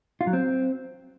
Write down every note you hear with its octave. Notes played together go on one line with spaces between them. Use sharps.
F4
F#3
C4